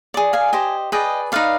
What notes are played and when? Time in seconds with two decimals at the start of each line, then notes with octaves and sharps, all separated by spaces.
0.14 G#4 D5
0.33 F5 G#5
0.53 G4 C5 D#5
0.92 G#4 B4 D5 D#5 G5
1.32 D#4 B4 D5 F5